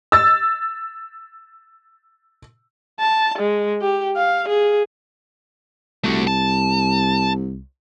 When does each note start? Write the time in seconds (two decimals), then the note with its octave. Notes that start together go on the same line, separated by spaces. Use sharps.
0.12 E6 A6
3.00 A5
3.38 G#3
3.81 G4
4.16 F5
4.48 G#4
6.04 C2 A3 F#4
6.27 A5